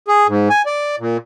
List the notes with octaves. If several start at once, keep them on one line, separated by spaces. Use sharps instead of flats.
G#4
G#2
G#5
D5
A#2